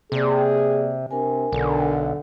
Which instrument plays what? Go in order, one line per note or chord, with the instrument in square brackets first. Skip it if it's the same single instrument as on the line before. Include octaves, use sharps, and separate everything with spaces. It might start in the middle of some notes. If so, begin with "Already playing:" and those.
[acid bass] C3 [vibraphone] A#3 D5 [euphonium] G#4
[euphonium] C3 [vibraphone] D4 A#4 G#5
[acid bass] B1 [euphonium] D3